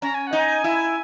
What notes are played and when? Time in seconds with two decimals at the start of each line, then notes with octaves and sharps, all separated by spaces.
0.02 C#4 A#5
0.14 G#5
0.27 F#5
0.33 D#4
0.39 G#5
0.64 E4